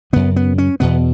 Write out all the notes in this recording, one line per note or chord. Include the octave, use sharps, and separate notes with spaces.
F#2 C#3 B3
B3
C#4
E2 B2 B3